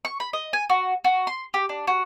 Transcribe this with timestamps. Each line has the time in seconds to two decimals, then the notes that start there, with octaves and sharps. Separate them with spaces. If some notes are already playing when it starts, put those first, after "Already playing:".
0.05 C#6
0.20 B5
0.33 D#5
0.53 G#5
0.70 F#4
1.04 F#4
1.27 C6
1.54 G4
1.69 D4
1.87 F#4